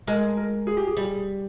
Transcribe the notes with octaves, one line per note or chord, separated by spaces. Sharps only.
G#3 A#4
A#4
G#4
G4
G#4
G3